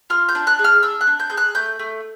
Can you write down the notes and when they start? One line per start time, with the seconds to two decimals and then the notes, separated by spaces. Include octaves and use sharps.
0.10 F4 F6
0.29 G6
0.35 D4
0.47 F#6
0.59 G#4
0.64 F6
0.83 D4 E6
1.01 F#6
1.07 D4
1.20 G6
1.30 G#4 G6
1.37 F#6
1.55 A3 G6
1.79 A3